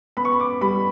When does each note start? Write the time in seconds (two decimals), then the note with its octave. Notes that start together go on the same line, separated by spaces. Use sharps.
0.17 B3 B5
0.25 C#6
0.32 B5
0.40 D6
0.61 G3 B5